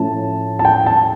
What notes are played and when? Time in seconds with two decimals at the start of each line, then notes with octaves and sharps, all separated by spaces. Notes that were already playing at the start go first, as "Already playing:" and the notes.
Already playing: A2 F3 C#4 A5
0.59 A5
0.65 G5
0.86 A5